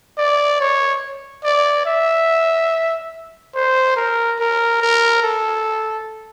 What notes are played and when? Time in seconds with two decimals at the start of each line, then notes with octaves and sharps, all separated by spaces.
0.18 D5
0.60 C#5
1.44 D5
1.86 E5
3.55 C5
3.96 A#4
4.40 A#4
4.82 A#4
5.23 A4